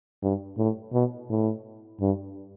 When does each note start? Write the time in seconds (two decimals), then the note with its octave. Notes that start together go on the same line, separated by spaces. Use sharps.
0.22 G2
0.58 A2
0.93 B2
1.29 A2
2.00 G2